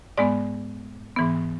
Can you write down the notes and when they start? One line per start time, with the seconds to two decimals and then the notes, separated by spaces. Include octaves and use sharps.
0.18 G#2 G#3 B3 D5
1.16 G#2 E3 B3